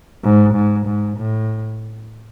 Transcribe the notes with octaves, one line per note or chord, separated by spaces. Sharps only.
G#2
G#2
G#2
A2